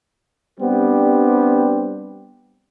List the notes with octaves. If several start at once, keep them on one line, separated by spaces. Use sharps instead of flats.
G3 B3 C4 D4 G4